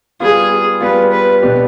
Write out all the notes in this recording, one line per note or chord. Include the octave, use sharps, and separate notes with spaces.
G3 B3 F4 G#4
G3 B3 F4 B4
B4
B2 B3 D4 G4